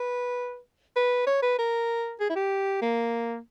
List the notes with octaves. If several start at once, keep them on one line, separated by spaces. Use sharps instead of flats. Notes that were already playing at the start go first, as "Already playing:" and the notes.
Already playing: B4
B4
C#5
B4
A#4
G#4
E4
G4
A#3